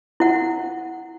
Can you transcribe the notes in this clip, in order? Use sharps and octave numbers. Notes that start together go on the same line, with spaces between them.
E4 F#5